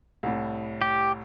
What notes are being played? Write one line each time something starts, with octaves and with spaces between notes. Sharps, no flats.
C2 A2
G4